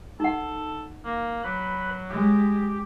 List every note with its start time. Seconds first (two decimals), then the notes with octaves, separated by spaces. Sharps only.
0.20 D#4 A4 F#5
1.05 A#3
1.44 F#3 B4 B5
2.10 G#3 G4